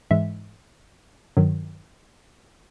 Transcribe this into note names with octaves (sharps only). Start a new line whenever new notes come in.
G#2 E3 G#3 E5
G2 D#3 F#3